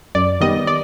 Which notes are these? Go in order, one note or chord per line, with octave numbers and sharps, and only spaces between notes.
F#2 D5
D#3 G3 B3 D#5
D5